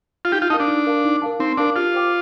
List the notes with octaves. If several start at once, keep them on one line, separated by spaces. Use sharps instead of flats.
F4
D#4 G4
F4
D#4 A#4 F5 A5
D4
D#4
A#4 F5 A5
D#4
A#4 F5 A5
C4 D#4
D4 A#4 F5 A5
F4 G4
C5 G5 D6